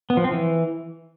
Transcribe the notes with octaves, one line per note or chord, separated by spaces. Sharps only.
B3
F3
C4
E3